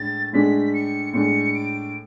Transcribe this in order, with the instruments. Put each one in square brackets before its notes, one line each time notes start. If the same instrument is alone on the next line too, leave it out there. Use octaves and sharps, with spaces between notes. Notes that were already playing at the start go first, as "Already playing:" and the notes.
Already playing: [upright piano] A2 G#3 D4 [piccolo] A6
[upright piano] A2 G#3 D4 [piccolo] B6
[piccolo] C#7
[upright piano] A2 G#3 D4 [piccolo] C#7
[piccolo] D7